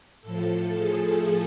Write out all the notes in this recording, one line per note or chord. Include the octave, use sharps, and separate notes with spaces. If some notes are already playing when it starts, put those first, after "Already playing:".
A2 F3 A4
G#4